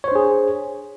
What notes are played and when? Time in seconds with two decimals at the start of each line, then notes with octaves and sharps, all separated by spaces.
0.04 C#5
0.08 C5
0.12 D4
0.15 G#4